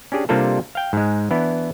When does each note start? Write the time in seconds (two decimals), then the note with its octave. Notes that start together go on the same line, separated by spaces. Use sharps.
0.12 C#4 D4 G4 G#4
0.29 C3 G3 A#3 D4 F4 A4
0.75 F5 G5
0.93 G#2 G#3
1.31 E3 B3 D4 E4